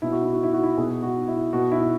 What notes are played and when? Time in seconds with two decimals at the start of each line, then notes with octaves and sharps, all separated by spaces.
0.02 B2 E4
0.12 F#4
0.23 E4
0.33 F#4
0.43 E4
0.53 F#4
0.63 E4
0.77 B2 G#4
1.03 F#4
1.28 E4
1.53 B2 F#4
1.72 E4